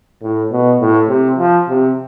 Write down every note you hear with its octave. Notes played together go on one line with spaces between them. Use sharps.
A2
B2
A2
C3
F3
C3